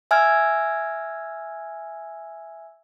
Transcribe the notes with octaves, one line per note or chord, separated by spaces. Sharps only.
E5 G#5 E6 F6 G#6